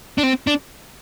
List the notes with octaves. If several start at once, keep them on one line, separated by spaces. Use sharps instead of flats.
D4
C4
D4